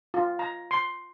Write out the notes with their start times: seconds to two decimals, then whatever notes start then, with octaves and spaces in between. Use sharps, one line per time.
0.14 F4
0.39 A#5
0.71 C6